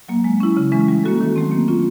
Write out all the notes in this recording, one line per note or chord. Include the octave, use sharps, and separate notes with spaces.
F#3 A#3
G#3
C#4 E4
C#3
E3 G#3 C#4
G3
A#3 C#4 F#4 A4
D#3
F#3 A3 C4
A#3
C#4 F4